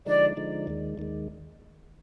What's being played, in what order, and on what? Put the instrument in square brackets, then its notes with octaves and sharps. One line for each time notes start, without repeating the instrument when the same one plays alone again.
[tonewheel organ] D3 F3 G#3 D#4 [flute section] D5
[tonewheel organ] D3 F3 G#3 D#4
D#2 D#3 G#3
D#2 D#3 G#3